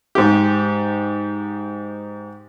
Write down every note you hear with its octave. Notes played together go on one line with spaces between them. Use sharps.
G#2 G4